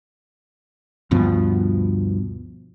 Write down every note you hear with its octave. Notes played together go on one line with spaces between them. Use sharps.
D2 G2 B2 F3